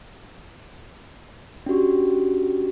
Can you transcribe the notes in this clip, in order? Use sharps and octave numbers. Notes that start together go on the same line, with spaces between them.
C#4 D4 F#4 G4